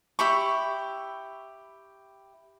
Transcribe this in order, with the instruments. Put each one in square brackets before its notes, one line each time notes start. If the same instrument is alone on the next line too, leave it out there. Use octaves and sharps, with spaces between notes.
[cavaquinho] E4 G4 B5 C#6